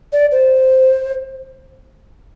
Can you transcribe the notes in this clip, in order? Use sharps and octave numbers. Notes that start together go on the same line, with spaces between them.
D5
C5